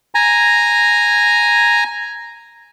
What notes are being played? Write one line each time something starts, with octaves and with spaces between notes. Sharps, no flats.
G#5 A#5